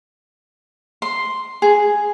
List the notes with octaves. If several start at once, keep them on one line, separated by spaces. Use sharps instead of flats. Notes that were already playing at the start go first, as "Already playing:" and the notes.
C6
G#4